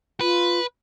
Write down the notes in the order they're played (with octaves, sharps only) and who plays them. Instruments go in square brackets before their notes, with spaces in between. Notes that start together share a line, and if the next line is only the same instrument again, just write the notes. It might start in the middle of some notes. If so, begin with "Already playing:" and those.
[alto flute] F4 [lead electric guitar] B4